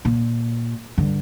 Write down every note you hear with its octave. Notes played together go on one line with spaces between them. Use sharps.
A#2
G2 D3